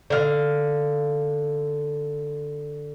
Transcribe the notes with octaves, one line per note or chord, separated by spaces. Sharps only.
D3 F5